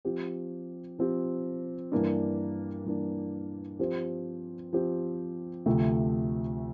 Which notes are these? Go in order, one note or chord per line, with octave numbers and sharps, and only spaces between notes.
F3 C4 G4
F3 C4 G4
G2 E3 A#3 D4
G2 E3 A#3 D4
F3 C4 G4 C5
F3 C4 G4 C5
D2 C3 F3 A3